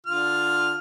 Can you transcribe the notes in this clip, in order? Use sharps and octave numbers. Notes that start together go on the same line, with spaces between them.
D3 F4 F6